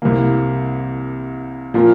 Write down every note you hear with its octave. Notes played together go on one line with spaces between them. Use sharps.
C2 C3 E3 A#3
A#2 F3 A#3